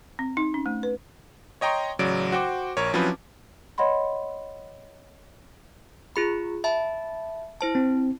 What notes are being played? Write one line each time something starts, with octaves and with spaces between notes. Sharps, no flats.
C4
D#4
C#4
A3
B4
C#5 D#5 G5 A#5 C6 C#6
A1 C#3 F#3 D5 D7
F#4 C5 G5 D6
A#1 A#4 C#5
F3 F#3 C4 C#4 E4 B4
C#5 D#5 F#5 B5 C6
F4 G#4 B5
E5 A5 B5
E4 C5 A5
C4